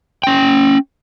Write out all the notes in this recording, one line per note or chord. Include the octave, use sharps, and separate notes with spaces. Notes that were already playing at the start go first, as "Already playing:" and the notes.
C#4 G5